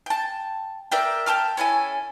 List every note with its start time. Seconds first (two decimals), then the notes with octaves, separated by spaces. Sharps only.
0.06 G5 A5
0.92 A#4 D5 E5 G5
1.26 G5 A5 D6 F6
1.57 C#4 E4 A4 G#5